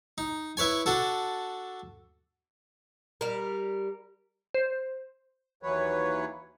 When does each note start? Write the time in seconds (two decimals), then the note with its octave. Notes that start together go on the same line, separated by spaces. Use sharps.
0.18 D#4
0.57 E4 B4 C#5 G#5
0.86 D4 F#4 A4
3.21 G3 A#4
4.54 C5
5.63 D#2 E3 F#3 B4 C#5